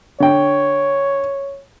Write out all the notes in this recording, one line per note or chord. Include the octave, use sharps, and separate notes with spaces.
D3 C#5 G5